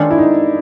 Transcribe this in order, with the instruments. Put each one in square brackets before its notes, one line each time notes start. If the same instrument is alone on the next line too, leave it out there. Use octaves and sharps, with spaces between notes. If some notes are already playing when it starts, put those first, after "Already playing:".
Already playing: [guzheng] D#3 G#3 C#4 F4 A4 [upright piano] D4
[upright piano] E4
D#4